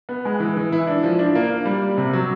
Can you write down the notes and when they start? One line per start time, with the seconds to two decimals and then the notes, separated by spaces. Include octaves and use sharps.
0.09 B3
0.25 G#3
0.40 E3
0.57 E3
0.72 E4
0.87 D4
1.04 F3
1.19 D4
1.35 A#3
1.50 A#3
1.66 G3
1.82 G3
1.97 C3
2.13 F#3